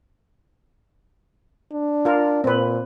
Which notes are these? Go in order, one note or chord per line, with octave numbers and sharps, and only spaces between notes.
D4
F4 A#4
A#2 C4 B4